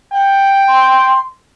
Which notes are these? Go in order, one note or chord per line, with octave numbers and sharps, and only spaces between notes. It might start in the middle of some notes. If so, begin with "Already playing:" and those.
F#5 G5
C6